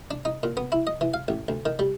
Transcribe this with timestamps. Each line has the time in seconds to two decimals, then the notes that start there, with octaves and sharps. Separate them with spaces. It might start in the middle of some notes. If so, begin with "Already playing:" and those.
0.11 D4
0.25 D#4
0.43 A#2
0.57 B3
0.72 E4
0.87 D#5
1.01 E3
1.14 F5
1.28 A1
1.48 D2
1.65 D#3
1.79 G3